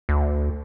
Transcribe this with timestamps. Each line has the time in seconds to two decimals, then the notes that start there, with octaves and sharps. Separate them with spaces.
0.09 D2